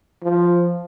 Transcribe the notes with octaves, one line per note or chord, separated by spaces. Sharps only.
F3